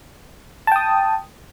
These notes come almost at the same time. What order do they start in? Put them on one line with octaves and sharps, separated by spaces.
A5 G5 D#6